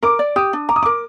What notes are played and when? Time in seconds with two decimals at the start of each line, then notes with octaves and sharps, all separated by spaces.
0.03 A#4 D6
0.19 D5
0.36 G4 D#6
0.53 D4
0.69 A#5 D6
0.76 D#6
0.83 A#4 D6